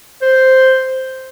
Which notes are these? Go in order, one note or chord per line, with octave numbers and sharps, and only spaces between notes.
C5